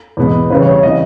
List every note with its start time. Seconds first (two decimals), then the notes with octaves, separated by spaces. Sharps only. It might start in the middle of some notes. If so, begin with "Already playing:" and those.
0.17 E2 B2 G#3 B3
0.50 E2 C#3 G3 B4
0.62 C#5
0.73 C#5
0.83 C#3 E3 G3 D#5